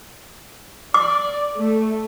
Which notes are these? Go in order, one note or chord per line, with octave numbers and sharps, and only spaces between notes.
D5 D6
A3